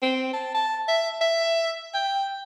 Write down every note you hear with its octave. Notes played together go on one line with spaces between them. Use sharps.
C4
A5
A5
E5
E5
G5